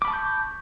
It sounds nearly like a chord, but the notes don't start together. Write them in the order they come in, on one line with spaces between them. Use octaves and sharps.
D6 B5 A5 C#6 G6